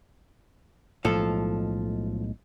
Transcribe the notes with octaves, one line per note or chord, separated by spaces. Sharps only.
B1 A2 F3 G#3 A4